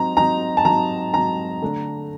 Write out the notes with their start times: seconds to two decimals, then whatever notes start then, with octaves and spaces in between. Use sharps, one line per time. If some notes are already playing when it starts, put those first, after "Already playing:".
Already playing: F#3 C4 D#4 A#5
0.16 F#3 C4 D#4 A#5
0.57 A5
0.65 F#3 C4 D#4 A#5
1.14 F#3 C4 D#4 A#5
1.62 D3 A3 D4